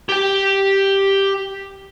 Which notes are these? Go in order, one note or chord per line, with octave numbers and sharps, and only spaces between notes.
G4 G5